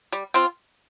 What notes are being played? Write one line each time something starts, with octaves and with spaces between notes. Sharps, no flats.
G3
C4 F4